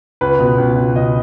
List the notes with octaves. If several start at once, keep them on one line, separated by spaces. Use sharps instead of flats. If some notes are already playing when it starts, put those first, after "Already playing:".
C#2 B4
B2
C#2
B2
C#2 D#5